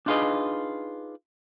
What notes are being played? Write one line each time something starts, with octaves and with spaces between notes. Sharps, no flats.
D4 D#4 F4 G#4 B4 D#5